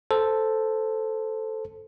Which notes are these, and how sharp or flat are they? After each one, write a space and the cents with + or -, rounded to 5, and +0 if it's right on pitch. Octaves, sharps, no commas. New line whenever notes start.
A4 +0 C5 -5